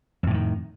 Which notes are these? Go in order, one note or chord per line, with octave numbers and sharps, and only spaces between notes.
F2 A2 C3 D#3